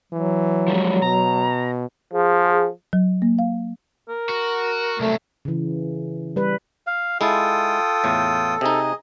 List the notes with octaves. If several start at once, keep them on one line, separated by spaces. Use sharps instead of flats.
E3 F#3
F3 G3 G#3
B2 A#5
F3 G#4
F#3
A#3
F5
A#4
F#4
C2 F#3 A3
C#3 E3
G3 B4
F5
G#3 E4 F4 A4 G5 D#6
E2 A2
C3 D#4 G#4 D#5